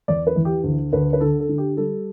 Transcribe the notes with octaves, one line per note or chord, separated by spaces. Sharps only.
E2 D5
B4
E3
G4
D2
D2 B4
B4
D3 A4
A4
D3
G4
G3 A4